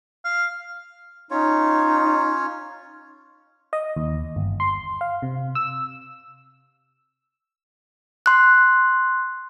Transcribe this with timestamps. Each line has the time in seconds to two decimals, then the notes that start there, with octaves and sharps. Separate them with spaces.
0.25 F5
1.31 C#4 D#4 F4 C#5
3.73 D#5
3.96 D#2
4.36 G1
4.60 C6
5.01 F5
5.22 C3
5.55 E6
8.26 C6 F#6